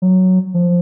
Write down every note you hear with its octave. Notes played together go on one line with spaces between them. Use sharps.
F#3
F3